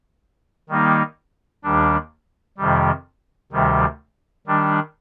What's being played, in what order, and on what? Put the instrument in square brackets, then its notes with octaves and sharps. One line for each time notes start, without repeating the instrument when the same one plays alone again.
[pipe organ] D#3 G3 A#3 D#4
D#2 D#3 G3 D4
F2 C3 D#3 G3
D2 C3 D#3 G3
D#3 G3 D4